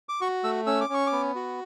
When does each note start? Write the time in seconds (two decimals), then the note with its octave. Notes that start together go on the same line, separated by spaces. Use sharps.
0.09 D6
0.21 F#4 C#6
0.44 A3 E6
0.66 C#4 E6
0.81 D6
0.89 C#4 C#6
1.07 D6
1.12 B3
1.35 F#4